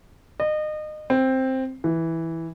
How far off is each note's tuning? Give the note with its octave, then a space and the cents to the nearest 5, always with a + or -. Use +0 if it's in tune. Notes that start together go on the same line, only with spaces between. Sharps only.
D#5 -30
C4 +5
E3 -5